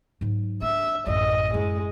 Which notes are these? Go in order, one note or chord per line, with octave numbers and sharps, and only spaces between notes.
G#2 F#3
D4 E5
A1 F#2 D#5
F#2 G#3 E4